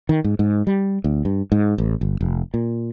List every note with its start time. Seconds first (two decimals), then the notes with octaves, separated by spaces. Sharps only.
0.09 D#3
0.24 G#2
0.39 G#2
0.67 G3
1.04 D2
1.25 G2
1.52 G#2
1.78 A1
2.01 G1
2.21 F1
2.54 A#2